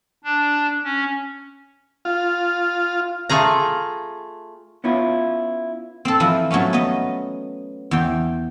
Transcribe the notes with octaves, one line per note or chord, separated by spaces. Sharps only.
D4
C#4
F4
A3 F4 G#4 A#5
B3 C#4 E4 F4
C4 A4
E3 F3 E4
F3 F#3 A3 B3 C#4
B3 D#5
E2 G5